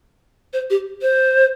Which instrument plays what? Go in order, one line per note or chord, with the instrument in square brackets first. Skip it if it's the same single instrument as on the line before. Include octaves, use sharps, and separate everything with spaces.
[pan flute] C5
G4
C5